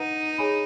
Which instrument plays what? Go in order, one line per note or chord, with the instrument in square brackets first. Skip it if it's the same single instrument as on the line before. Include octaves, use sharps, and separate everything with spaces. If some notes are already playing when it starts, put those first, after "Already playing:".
Already playing: [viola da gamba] D#4 [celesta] B4 F#5 A#5
[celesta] G#4 C#5 G#5 B5